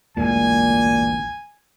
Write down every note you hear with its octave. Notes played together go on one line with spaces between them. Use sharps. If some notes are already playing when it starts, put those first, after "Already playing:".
A1 D2 A#2 G#3 G#5